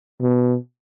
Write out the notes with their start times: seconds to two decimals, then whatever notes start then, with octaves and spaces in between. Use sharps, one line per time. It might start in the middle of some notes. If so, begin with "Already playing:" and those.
0.21 B2